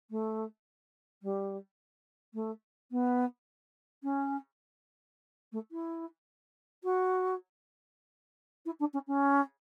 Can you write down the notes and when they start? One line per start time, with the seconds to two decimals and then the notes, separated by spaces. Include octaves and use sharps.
0.10 A3
1.22 G3
2.34 A3
2.91 B3
4.03 C#4
5.52 A3
5.71 E4
6.83 F#4
8.65 E4
8.79 D4
8.93 C#4
9.07 C#4